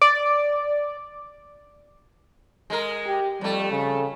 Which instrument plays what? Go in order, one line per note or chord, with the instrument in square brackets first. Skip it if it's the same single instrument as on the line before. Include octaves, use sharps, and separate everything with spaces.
[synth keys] D5
[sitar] G#3 A#4
[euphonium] G4
[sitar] F2 A3 [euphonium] G3
[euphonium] C#3